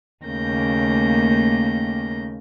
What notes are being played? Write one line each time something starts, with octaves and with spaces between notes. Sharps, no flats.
D#2 C#3 A3 A#3 G6 A#6